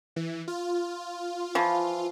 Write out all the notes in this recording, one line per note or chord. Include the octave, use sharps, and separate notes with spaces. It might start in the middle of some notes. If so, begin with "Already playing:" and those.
E3
F4
E3 F3